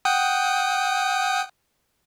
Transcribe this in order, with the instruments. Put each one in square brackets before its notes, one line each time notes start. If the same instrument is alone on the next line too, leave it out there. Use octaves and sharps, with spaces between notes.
[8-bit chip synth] F#5 G5 D#6